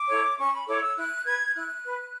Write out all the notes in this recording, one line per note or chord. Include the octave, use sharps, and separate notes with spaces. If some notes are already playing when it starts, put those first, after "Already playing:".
Already playing: D6
E4 A4 C#5
C#4 C#6
B5
E4 A4 C#5 D6
E6
E4 F#6
B4 G#6
E4 F#6
B4